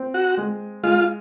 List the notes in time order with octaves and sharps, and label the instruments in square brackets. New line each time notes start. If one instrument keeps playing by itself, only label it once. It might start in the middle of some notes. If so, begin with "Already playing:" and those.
Already playing: [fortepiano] C4
[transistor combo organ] F#4
[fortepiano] G#3
[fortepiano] G#3 [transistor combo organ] F4